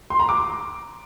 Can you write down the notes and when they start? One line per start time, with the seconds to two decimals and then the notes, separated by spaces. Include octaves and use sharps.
0.10 C6
0.20 A#5
0.29 D6